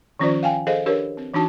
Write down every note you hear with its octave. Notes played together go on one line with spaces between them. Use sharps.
D#3 F3 C#4 F4 C5 D5
F5 G5 G#5
G#4 A4 C5 D#5 F5
D4 G4 A#4 B4 C#5
C4
E3 D4 D#4 F#4 A5